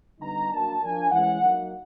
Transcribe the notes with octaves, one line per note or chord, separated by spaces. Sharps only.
D3 G3 B3 D#4 A#5
F#3 A#3 D4 A5
F3 A#3 D4 G#5
E3 G#3 C#4 E4 F#5
F#3 A#3 D#4